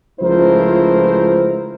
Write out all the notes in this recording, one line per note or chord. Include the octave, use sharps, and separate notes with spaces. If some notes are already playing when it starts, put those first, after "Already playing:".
C#2 F3 A3 E4 A#4 C5